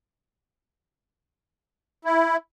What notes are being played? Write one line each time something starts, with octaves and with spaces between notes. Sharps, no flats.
E4